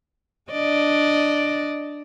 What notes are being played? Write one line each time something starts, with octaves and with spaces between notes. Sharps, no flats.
D4 D5 D#5